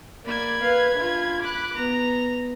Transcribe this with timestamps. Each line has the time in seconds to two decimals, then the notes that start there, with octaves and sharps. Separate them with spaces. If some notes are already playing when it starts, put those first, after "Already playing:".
0.25 A#3 D5 B5 G#6
0.62 B4 F5
0.94 D4 F4
1.41 B5 D6 F#6
1.76 B3 A#5